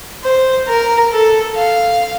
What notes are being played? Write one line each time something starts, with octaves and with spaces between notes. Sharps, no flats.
C5
A#4
A4
F5